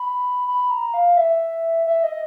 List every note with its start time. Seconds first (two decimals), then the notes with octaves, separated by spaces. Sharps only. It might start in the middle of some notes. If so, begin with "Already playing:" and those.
Already playing: B5
0.48 B5
0.71 A#5
0.94 F5
1.17 E5
1.87 E5
2.04 D#5